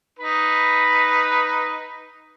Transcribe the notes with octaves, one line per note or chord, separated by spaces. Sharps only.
D#4 B4 B5